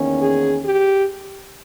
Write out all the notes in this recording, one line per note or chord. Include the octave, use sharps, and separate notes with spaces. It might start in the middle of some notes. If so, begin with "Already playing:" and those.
Already playing: E2 D#3 A#3 C#4
G#4
G4